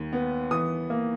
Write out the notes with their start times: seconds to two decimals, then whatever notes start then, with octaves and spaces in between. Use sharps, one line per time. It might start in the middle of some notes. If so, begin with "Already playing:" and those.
Already playing: D#2
0.13 B3
0.51 E3 D#6
0.90 A#3